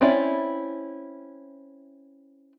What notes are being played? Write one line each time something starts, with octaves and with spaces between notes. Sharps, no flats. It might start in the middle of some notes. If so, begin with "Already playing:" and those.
C4 C#4 E4 D5